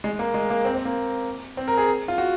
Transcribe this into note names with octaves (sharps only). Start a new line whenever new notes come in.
G#3
A#3
G#3
A#3
C4
C4
A#3
C4
A#4
G#4
F4
F#4